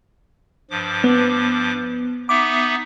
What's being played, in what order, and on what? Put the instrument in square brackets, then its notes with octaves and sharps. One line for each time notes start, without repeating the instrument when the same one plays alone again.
[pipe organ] G2 F3 D6
[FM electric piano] B3
[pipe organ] B3 D#4 E5 [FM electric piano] D6